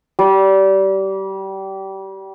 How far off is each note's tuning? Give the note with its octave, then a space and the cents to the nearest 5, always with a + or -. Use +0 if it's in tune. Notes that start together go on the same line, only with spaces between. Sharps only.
G3 -25